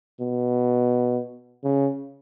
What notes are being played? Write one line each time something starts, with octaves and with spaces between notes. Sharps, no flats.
B2
C#3